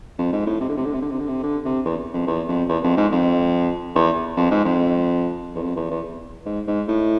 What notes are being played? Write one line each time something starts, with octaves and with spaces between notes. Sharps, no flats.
F2
G#2
A2
C3
D3
C3
D3
C3
D3
C3
D3
C3
D3
C3
E2
F2
E2
F2
E2
F2
G#2
F2
E2
F2
G#2
F2
E2
F2
E2
E2
G#2
G#2
A2